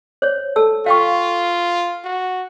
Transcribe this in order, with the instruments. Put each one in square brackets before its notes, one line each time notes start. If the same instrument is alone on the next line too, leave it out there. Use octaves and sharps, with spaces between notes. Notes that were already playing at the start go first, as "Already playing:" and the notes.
[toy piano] C5 C#5
A4 A5 E6
[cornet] F4 [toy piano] F5 G5 C#6
[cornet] F#4